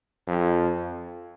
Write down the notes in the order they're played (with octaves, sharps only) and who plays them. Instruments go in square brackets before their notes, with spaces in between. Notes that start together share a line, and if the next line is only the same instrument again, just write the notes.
[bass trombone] F2